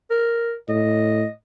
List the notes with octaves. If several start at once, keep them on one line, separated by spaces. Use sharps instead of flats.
A#4
A2 D#5